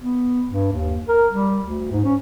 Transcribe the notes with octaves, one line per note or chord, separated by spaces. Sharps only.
B3
G2
D#2
A#4
G3
D2
G#2
C#4